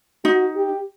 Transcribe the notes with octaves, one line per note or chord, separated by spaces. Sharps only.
D#4 F#4
G4